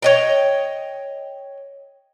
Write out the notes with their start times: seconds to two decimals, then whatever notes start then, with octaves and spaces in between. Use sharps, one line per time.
0.02 C#5 D#5 G5